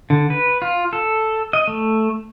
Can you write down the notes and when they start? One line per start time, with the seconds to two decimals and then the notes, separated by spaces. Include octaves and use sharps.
0.10 D3
0.30 B4
0.62 F4
0.93 A4
1.53 D#5
1.68 A3